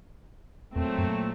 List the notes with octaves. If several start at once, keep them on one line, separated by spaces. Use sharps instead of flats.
E2 A#2 F#3 A3 C4
F#2